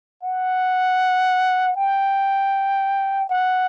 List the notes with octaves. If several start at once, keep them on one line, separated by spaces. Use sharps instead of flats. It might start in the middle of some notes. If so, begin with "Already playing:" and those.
F#5
G5
F#5